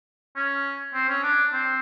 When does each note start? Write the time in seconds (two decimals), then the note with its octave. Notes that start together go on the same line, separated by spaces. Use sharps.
0.36 C#4
0.94 C4
1.09 C#4
1.24 D4
1.53 C4